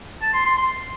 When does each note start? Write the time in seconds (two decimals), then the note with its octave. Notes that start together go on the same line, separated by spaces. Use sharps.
0.22 A5
0.34 C6
0.46 C6
0.58 C6